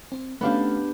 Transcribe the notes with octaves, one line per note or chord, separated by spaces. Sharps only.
C4
A3 B3 C#4 D4 G4 F5